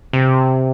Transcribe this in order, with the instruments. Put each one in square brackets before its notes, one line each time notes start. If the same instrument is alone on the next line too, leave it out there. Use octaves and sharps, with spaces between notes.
[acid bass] C3